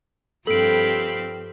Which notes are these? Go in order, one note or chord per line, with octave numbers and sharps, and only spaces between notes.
G2 F3 C4 A4 F5 G5 B5 D7